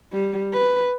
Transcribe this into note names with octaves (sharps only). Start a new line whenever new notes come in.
G3
B4